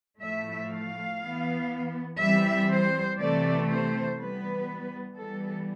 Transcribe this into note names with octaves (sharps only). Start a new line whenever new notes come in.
A2 F3 A3 E5
F5
E3 B3
E3 G3 C4 E5
C5
C3 E3 A3 C4 D5
C5
E3 G3 B3 B4
E3 G3 B3 A4